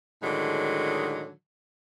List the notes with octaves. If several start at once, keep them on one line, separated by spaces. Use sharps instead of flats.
A2 D3 D#3 F#3 G#3